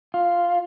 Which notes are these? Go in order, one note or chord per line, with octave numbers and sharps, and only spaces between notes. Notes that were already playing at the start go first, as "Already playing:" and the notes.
F4